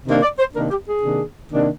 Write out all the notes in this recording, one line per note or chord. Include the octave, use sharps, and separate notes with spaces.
C3 D#3 A#3 D4
D5
C5
C3 D#3 A#3 D4 A#4
G4
G#4
C3 D#3 A#3 D4
C3 D#3 A#3 D4